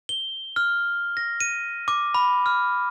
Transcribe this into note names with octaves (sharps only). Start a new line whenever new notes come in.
G7
F6
A#6
D#7
D6
B5
F6